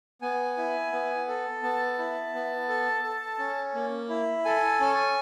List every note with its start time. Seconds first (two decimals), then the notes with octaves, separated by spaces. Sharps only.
0.22 B3 G#5
0.57 E4
0.92 B3
1.28 A4
1.63 B3 A5
1.98 E4
2.34 B3
2.69 A4
3.04 A4
3.39 C#4
3.74 A#3
4.09 E4
4.45 A4 G#5
4.80 C#4